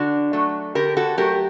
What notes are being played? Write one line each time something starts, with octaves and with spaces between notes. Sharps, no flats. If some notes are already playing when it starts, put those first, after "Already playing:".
Already playing: D3 D4 F#4
F#3 A3
D3 G4 A#4
F#4 A4
F#3 A3 G4 A#4